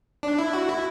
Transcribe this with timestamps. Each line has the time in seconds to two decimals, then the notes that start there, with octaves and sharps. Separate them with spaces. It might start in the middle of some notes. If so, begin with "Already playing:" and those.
0.23 D4
0.38 E4
0.53 F#4
0.69 E4